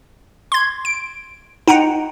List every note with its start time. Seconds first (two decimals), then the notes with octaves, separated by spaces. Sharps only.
0.52 C6 G#6
0.85 D7
1.68 D#4 F#5 G5 A#5